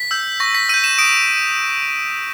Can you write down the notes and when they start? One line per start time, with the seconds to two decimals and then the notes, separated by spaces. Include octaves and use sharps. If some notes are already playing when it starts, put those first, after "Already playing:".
Already playing: B6
0.11 E6 G6
0.40 C#6 A#6
0.55 B6
0.69 E6 G6 D#7
0.84 E7
0.98 D#6 D7